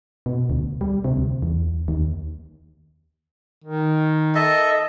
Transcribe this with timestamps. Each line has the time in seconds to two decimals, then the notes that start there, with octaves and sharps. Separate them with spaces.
0.26 B2
0.50 D2
0.81 G3
1.04 C3
1.17 D2
1.42 E2
1.88 D#2
3.64 D#3
4.35 A4 D#5 E5